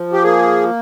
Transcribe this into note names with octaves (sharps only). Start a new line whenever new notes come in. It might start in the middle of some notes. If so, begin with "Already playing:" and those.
Already playing: F3
G4
A#3 G#4